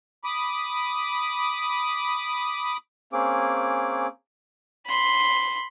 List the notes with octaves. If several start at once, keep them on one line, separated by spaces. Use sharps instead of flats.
B5 D6 D#6
A#3 C4 C#4 G#4 D6
B5 C6